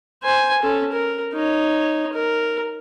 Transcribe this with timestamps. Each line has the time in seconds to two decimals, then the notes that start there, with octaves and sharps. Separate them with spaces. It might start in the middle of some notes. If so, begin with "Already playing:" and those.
0.23 C5 G#5
0.62 C#4 A4
0.92 A#4
1.33 D#4 C#5
2.13 A#4